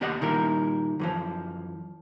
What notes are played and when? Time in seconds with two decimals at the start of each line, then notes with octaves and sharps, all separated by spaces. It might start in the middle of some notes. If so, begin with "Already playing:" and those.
0.01 D#2 B3 G4 D5 D#5 F#5
0.21 A#2 D#3 G3 E4 A#4
1.00 F#2 E3 F3